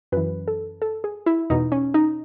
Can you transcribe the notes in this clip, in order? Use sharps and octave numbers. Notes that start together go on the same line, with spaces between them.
F#2 E3 B4
A4
A4
G#4
E4
E2 B2 D#4
C#4
D#4